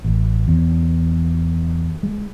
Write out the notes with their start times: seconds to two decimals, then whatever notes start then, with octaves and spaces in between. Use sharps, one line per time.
0.05 A1
0.48 E2
2.03 G#3